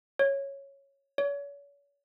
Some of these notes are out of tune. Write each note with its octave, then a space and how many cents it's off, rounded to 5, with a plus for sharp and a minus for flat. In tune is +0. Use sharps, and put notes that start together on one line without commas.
C#5 -5
C#5 +40